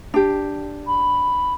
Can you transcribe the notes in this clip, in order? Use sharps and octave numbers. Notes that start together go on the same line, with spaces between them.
D4 G4
B5